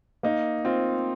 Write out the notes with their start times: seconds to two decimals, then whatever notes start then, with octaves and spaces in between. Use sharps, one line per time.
0.23 A#3 D#4
0.65 C4 F4